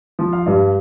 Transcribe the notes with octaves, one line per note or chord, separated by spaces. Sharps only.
F3
F5
G2